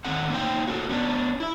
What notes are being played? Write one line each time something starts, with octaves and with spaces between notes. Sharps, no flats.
D#3 C4 A4 F#5
A#3 C#4 D#4 C5 G5
F#4 A4 A#4
B3 C#4 D4
E4 E5